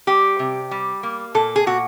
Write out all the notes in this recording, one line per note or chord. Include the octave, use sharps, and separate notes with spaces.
G3 G4
C3
G3
A#3
A#2 A4
G#4
A#2 F#4